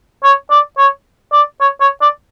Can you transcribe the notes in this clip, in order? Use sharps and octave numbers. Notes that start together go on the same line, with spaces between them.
C#5
D5
C#5
D5
C#5
C#5
D5